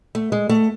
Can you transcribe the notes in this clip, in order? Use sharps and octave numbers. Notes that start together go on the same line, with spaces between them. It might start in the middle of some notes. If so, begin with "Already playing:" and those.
A3
G#3
A3